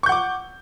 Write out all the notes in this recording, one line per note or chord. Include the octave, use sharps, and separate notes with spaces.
F#5 C#6 D6 G6